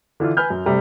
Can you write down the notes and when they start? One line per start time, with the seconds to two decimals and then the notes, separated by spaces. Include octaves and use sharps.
0.20 D3 E3 D4 F4
0.37 B4 G#5 F6 G6
0.50 F#2
0.66 C3 G3 A3